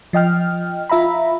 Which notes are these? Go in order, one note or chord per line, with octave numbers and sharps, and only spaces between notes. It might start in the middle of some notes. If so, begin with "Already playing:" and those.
F3 D#5 G5 F6
F4 E5 A#5 B5